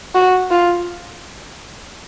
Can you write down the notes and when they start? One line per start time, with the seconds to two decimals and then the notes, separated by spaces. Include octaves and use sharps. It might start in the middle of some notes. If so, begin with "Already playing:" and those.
0.15 F#4
0.51 F4